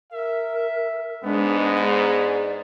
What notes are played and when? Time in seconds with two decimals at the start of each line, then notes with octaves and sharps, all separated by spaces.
0.13 A#4 E5
1.24 G#2 G#3 B3 D4
1.78 G#4 D5